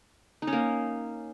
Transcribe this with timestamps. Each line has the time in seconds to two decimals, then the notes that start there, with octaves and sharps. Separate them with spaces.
0.42 D#4
0.47 C#4
0.53 A#3